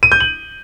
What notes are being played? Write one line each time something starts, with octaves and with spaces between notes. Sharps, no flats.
D#7
G6
F#7